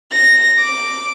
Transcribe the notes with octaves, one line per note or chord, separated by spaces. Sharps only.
A#6
D6